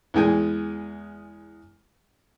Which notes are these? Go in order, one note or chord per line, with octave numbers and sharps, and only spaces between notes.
E2 E3 G#3 G5 G#5